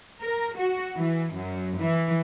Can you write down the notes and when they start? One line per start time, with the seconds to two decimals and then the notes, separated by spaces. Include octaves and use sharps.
0.21 A#4
0.57 F#4
0.97 E3
1.34 F#2
1.79 E3